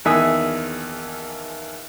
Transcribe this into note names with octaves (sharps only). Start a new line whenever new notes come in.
A#1 E2 D#3 E5 G#5 D#6